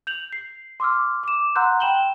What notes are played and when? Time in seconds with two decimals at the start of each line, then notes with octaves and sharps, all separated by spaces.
0.07 G6 F7 F#7
0.33 C7
0.80 C6 D6 E6 F6
1.23 D6 E7
1.56 F#5 A#5 C6 E6 F#6 G6
1.80 G5 B5 E7 F#7 G7